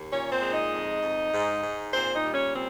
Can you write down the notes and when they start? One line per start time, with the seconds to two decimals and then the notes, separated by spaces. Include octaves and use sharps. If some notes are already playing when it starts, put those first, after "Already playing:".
Already playing: D#2
0.11 A#2 C#4 C#5
0.32 C4 C5
0.42 G#3
0.52 D#4 D#5
0.72 F2
1.03 F2
1.33 G#2
1.63 G#2
1.93 A#2 C4 C5
2.14 D#4 D#5
2.24 G3
2.34 C#4 C#5
2.54 A#2 C4